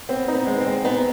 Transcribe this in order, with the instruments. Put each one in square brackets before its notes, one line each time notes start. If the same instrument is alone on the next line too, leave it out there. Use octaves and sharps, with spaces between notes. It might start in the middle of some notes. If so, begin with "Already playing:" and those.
[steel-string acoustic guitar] B3 [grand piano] C4
[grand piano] D#4
[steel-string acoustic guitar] B3
[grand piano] G#3
[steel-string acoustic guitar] C4
[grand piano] G#3
[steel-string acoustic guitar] B3 [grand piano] D#4